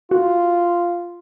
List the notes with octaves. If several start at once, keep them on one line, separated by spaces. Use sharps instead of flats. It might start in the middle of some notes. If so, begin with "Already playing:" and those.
F4 F#4